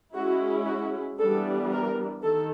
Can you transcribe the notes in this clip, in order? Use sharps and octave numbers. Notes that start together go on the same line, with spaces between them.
G#3 C#4 E4 F#4
F#4
E3 G3 B3 D4 A4
A#4
D#3 A4